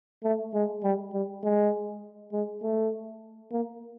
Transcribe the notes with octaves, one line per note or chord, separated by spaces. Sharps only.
A3
G#3
G3
G3
G#3
G#3
A3
A#3